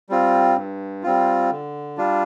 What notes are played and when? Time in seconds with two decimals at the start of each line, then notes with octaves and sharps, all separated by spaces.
0.09 G3 C4 F4
0.56 G2
1.03 G3 C4 F4
1.51 D3
1.97 G3 D4 F4